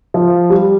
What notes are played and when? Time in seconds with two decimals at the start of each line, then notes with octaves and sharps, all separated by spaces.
0.14 F3
0.50 G3